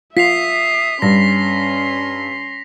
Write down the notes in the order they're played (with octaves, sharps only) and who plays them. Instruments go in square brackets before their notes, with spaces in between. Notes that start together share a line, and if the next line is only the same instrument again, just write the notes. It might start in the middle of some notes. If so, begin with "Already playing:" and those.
[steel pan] F4 [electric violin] E5 D#6 [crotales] B6 C7 F7
[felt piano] G2 [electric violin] C#4 C6 [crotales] A#6